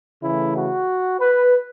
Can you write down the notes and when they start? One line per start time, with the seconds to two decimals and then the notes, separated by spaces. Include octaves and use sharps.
0.22 C#3 E3 A3 E4
0.56 F#4
1.20 B4